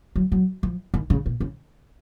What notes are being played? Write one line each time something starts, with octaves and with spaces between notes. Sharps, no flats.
F#3
F#3
F3
D#3
C#3
B2
C#3